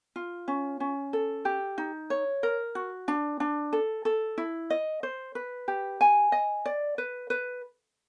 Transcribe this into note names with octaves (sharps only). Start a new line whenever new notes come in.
F4
C#4
C#4
A4
G4
D#4
C#5
A#4
F#4
D4
D4
A4
A4
E4
D#5
C5
B4
G4
G#5
D#5
D5
B4
B4